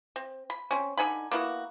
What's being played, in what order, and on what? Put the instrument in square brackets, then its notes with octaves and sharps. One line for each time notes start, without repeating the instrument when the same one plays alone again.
[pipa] C4
B5
C4 C#4
D3 D#4 G#5 B5
A#3 B3 E4 F#4